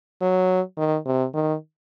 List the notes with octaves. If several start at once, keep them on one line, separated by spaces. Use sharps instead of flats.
F#3
D#3
C3
D#3